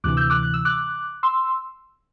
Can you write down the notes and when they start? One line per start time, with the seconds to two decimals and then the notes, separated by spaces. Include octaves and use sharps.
0.04 D2 C3 E3 D6 F#6
0.17 E6 G6
0.30 D6 F#6
0.43 F#6
0.54 E6
0.65 D6 F#6
1.23 C6 E6